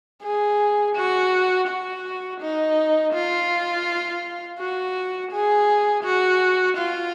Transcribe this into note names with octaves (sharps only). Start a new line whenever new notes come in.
G#4
F#4
F#4
D#4
F4
F#4
G#4
F#4
F4